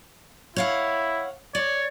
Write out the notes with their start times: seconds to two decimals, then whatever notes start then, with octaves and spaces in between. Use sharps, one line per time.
0.56 E4 C#5 F5 F#5
1.55 C#5 D5